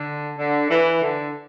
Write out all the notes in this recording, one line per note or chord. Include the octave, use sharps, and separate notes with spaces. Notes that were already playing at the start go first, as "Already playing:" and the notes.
Already playing: D3
D3
E3
D3